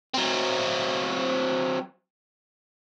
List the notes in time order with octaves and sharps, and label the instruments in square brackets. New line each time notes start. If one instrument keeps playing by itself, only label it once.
[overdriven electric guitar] F#3 C4